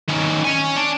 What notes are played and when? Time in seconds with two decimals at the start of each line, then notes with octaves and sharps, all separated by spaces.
0.09 D#3 C#4
0.45 C#5 G#5
0.76 D4